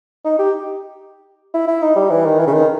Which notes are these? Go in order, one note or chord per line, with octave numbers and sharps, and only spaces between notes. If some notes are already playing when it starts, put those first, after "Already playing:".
D#4
G4
E4
E4
D#4
G3
E3
D#3
E3
C#3
D#3